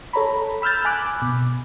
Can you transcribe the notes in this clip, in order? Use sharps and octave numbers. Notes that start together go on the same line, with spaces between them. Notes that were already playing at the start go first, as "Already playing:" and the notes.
A4 C#5 A#5 B5
B5 E6 F6 G6 A6
G#5 B5 D6 F#6
B2